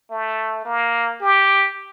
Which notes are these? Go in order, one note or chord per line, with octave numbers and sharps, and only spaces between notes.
A3
A#3
G4